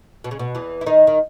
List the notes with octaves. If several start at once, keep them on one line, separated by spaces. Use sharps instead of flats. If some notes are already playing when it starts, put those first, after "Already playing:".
B2
C#3
B2
E2 E3
E4
D#3 D#4
D#3